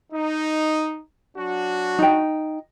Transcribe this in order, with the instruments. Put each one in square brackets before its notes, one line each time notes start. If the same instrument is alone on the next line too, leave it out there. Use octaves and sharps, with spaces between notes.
[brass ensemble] D#4
F#3 D4 F#4
[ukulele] D#4 G5